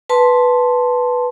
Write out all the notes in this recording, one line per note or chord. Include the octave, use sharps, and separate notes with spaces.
B4 A5 C6